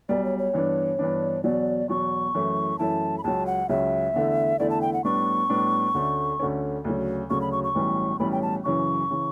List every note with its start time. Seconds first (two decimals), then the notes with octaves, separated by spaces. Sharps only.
0.09 B1 B2 G3 D5
0.24 C#5
0.39 C#5
0.53 G2 E3 B3 D4
0.99 G2 E3 B3 D4
1.43 E2 B2 F#3 D5
1.89 E2 B2 F#3 C#6
2.35 F#2 E3 A3 E4
2.78 F#2 E3 A3 E4 A5
3.18 B5
3.24 C#2 C#3 F#3 A5
3.46 F#5
3.69 C#2 C#3 F#3 E5
4.14 E2 D3 A3 E4
4.59 E2 D3 A3 E4 D5
4.70 A5
4.81 G5
4.93 F#5
5.04 A2 G3 B3 D4 C#6
5.49 A2 G3 B3 D4
5.94 D2 D3 A3 C#4
6.39 D2 D3 A3 C#4
6.84 D2 C#3 F#3
7.30 D2 C#3 F#3 C#6
7.41 B5
7.52 C#6
7.64 C#6
7.75 B1 A2 E3 G3 C#4
8.19 B1 A2 E3 G3 C#4 B5
8.31 G5
8.42 A5
8.64 F#2 C#3 E3 C#6
9.10 C#3 E3